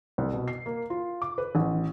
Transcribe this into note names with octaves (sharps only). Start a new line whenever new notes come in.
C2
B2
C7
A#3
F4
D6
B4
A1